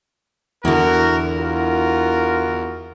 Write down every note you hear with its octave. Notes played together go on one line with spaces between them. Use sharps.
E2 D3 E4 F#4 A#4
F4 F#4 A#4